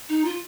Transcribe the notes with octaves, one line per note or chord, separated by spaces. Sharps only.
D#4
F4